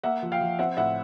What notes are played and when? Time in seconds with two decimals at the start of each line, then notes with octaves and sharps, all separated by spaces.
0.03 A#3 E5 F#5
0.23 F3
0.32 F5 G5
0.41 F3
0.59 C4 E5 F#5
0.77 A2 E5 F#5